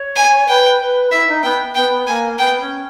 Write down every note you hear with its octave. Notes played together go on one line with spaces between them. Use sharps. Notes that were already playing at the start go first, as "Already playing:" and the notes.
Already playing: C#5
G#5
B4 G5
B4
E4 E5
D#4
B3 G5
B3 G5
A#3 G#5
B3 G5
C#4